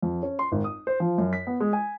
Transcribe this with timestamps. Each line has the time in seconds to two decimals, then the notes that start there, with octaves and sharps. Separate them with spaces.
0.02 F2
0.23 C#4
0.39 C6
0.52 G#1
0.64 D#6
0.87 C5
1.00 F3
1.18 F#2
1.33 B6
1.47 B3
1.60 G#3
1.73 G#5